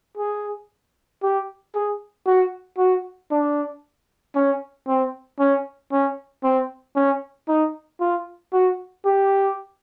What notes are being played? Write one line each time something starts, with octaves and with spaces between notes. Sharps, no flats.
G#4
G4
G#4
F#4
F#4
D4
C#4
C4
C#4
C#4
C4
C#4
D#4
F4
F#4
G4